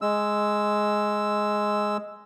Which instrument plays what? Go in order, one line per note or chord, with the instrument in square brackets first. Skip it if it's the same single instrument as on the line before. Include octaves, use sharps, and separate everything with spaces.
[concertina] G#3 E6